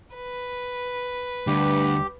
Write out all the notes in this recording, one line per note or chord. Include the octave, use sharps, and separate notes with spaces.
B4
D2 G2 G4